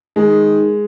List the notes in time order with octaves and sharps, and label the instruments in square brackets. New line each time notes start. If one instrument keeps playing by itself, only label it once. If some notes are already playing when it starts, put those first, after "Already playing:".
[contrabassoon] D#3 [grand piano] G#3